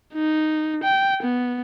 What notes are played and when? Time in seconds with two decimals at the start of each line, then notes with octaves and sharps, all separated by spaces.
0.14 D#4
0.83 G5
1.23 B3